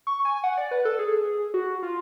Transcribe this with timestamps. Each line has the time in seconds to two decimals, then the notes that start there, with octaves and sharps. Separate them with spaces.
0.07 C#6
0.25 G#5
0.44 F#5
0.57 D5
0.71 B4
0.85 A4
0.99 G#4
1.54 F#4
1.83 F4